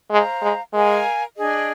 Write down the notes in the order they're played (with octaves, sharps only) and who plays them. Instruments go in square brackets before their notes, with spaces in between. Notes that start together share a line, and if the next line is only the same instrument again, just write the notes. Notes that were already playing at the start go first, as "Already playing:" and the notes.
[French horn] G#3 [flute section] C5 F5 A#5
[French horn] G#3
[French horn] G#3 [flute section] A#4 F5 G#5
[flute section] D4 G#4 D#5